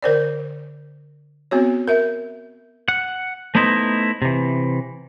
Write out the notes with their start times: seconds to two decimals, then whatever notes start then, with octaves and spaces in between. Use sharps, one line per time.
0.02 D3 A#4 C5 D5
1.51 B3 C4 F#4 C#5
1.88 A#4 E5
2.88 F#5
3.55 A3 B3 D#4 E4 C5 D#5
4.22 C3 E3